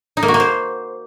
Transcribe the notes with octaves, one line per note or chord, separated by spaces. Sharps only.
D#4
A#3
F#4
A#3
C5